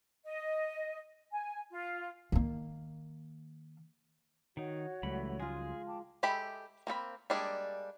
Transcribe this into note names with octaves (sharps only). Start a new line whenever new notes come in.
D#5
G#5
F4
D#3 A#3
D#3 D#4 F#4 C#5 F#5
C#2 E3 F#3 G3 A3 B5
G#3 F4 G#4
G5 A5 D6
G#3 G4 A4 E5 B5
A#3 C4 A4 B5
G3 G#3 A#3 D4 G#4